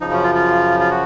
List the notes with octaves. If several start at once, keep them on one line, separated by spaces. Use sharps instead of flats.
F#2 C#3 F3 D#4
C#4
F4
F4
F4
F#4